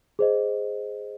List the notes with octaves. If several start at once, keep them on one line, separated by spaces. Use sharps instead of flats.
G#4 C5 D#5